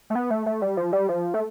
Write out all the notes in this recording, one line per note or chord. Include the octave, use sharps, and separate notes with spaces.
A3
B3
A3
A3
G3
F3
G3
F3
A3